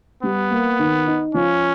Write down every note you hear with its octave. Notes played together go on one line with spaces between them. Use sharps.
G3 B3
A#3
D#3
D#4
F3 C#4